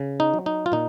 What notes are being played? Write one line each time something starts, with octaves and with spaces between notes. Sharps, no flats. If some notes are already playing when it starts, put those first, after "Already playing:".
Already playing: C#3
D#4
F#3
D#4
F4
A#2 D#4